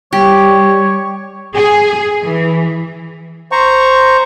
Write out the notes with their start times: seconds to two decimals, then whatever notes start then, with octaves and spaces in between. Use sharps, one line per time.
0.13 G3 G4 C#5
1.56 G#4
2.24 E3
3.52 C5 A#5 C#6